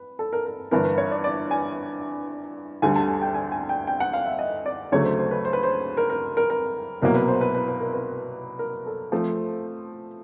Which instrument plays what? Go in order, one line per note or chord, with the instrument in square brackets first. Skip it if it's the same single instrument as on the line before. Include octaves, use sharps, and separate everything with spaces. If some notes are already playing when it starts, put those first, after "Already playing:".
Already playing: [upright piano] B4
A4
A#4
A#4
G1 G2 E3 A#4
B4
C#5
D5
D5
G#5
D2 D3 G3 G#5
A5
G#5
G5
G#5
G#5
G5
G5
F#5
F5
E5
D#5
D5
D2 C#3 F#3 A3 C#5
C5
C5
B4
C5
B4
C5
A#4
A#4
A#4
A#4
C2 B2 F#3 A#3 A#4
B4
C5
B4
B4
B4
A#4
B4
A#4
A4
F3 A3 C4